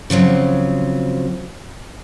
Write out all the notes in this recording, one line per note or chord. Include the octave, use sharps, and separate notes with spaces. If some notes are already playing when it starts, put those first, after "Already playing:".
C#3 F3 F#3 C4